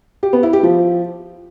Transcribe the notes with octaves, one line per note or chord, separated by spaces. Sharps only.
G4
B3
E4
G4
F3